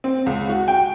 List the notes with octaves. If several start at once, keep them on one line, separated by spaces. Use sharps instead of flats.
C4
C#2
F#4
G5